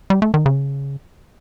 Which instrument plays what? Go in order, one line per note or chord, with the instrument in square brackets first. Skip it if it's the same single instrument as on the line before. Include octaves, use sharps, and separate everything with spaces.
[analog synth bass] G3
A3
D#3
C#3